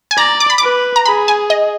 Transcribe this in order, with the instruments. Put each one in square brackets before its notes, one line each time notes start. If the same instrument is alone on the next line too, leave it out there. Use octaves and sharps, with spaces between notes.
[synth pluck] G#5
[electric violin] D5 [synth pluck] A#5
[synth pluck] D6
B5
[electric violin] B4 [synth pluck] D6
[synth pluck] A#5
[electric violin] G#4 [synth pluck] B5
[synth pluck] G#5
D#5